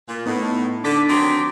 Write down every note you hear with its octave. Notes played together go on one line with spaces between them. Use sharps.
A#2
A2 B3 D#4
D3 D4 D6 B6
D#3 F#3 C4